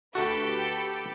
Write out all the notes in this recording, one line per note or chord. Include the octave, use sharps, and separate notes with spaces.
D2 A3 F#4 G4 A4 B4 B5